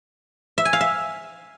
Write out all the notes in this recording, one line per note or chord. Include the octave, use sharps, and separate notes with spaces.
E5
G#5
F5
E5